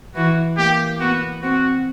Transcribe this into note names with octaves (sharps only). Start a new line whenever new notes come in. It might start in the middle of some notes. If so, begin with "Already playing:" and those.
E3 F#4
A#3 G4
B3 F#4
C4 F#4